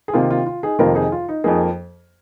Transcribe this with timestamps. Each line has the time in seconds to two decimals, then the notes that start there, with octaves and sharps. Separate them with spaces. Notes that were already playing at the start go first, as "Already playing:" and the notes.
0.08 G#4
0.13 C3 D#3 A#3 F4
0.31 F4
0.46 F4
0.63 D#4 G#4
0.79 F2 C3 D#3 A#3 F4 A#4
0.95 D#4 G#4
1.12 F4
1.28 D#4
1.44 F2 F3 A#3 D#4 G#4